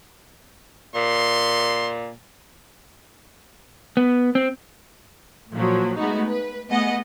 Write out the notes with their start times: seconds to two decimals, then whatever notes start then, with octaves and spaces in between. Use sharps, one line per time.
0.95 A#2 C6
3.97 B3
4.35 C4
5.52 A#2 F3 F#3
5.97 G#3 A3 B3 D#4 F#4
6.28 B4
6.70 A3 B3 G#4 D#5 F#5